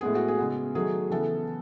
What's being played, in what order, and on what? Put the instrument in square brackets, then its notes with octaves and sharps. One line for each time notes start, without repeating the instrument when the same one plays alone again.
[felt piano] A2 G#3 B3 G#4
F#4
G#4
C#3 G#3 B3
D#3 F#3 A3 G#4
C#3 E3 B3 A4